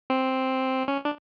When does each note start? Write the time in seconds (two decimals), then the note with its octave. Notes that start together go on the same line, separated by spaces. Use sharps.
0.10 C4
0.88 C#4
1.05 D4